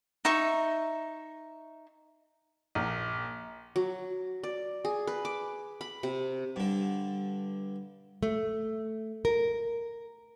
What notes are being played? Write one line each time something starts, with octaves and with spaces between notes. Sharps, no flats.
D#4 E5 C#6
A#1
F#3
D5
G#4
B4
D6
B5
C3
G2 D3
A3
A#4